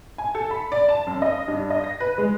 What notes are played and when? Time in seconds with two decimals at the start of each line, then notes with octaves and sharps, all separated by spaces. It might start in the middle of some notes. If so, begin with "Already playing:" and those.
0.18 G#5
0.35 A4
0.51 B5
0.72 D5
0.89 A5
1.07 F#2
1.22 D#5
1.48 G2
1.70 D#5
1.84 A#6
2.00 B4
2.18 G#3